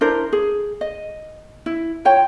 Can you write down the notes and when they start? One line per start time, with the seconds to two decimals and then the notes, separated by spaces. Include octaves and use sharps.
0.01 D4 E4 A#4 C5
0.33 G#4
0.81 D#5
1.66 E4
2.05 F4 C#5 G5